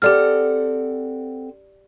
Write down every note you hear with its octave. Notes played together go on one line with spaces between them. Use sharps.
C4 G4 A4 D5 F#5 F6